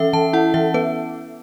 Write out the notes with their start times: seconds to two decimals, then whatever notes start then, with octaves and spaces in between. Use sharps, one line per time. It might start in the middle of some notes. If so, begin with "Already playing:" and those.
Already playing: E3 C#4 A4 E5
0.13 E3 A5
0.33 E4 F#5
0.54 E3 E5
0.74 B3 B4